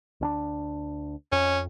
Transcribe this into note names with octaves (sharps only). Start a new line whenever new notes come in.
D2 C#4 D4
F2 C#4